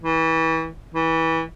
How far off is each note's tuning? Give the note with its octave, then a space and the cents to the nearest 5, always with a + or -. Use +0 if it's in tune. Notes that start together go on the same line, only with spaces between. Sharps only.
E3 -25
E3 -20